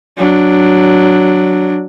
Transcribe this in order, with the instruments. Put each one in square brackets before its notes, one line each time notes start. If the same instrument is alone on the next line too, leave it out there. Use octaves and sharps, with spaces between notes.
[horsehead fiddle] F#3 D4